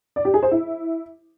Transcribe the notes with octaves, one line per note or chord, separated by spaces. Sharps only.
D5
G4
G#4
C5
E4